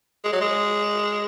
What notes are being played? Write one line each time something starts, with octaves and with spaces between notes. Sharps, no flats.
G#3
F#3
G#3